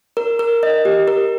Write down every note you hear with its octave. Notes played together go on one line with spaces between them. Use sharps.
A#4
A#4
D#5
G4
A#4